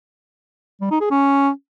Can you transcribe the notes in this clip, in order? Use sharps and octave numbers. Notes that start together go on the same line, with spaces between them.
G3
D#4
G#4
C#4